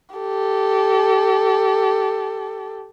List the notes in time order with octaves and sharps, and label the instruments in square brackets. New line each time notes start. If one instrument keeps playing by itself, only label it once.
[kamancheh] G4 A4